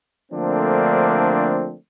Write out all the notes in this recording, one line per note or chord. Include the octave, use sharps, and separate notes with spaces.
D3 F3 A3 A#3 C4 D4